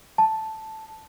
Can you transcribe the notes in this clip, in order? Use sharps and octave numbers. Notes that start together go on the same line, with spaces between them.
A5